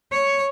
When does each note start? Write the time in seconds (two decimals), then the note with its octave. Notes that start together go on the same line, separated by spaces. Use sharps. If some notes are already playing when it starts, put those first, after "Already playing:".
0.12 C#5